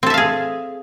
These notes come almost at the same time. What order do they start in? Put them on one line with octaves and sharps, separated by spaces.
C4 A4 E5 F5 G#4